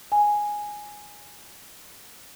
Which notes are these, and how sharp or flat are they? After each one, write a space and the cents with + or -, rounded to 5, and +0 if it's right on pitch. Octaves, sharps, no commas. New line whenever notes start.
G#5 +0